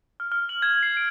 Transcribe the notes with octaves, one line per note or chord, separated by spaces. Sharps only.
F6
F6
F#7
G#6
C7
D7